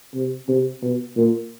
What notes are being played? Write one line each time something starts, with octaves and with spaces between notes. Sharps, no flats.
C3
C3
B2
A#2